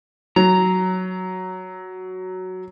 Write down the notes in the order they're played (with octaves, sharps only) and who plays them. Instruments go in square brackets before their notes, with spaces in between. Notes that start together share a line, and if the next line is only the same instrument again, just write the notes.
[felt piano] F#3 [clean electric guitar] A#5